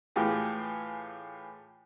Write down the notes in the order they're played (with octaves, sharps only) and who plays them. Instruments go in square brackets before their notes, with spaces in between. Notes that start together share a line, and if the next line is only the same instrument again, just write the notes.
[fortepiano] A2 E3 F4 G4 G#4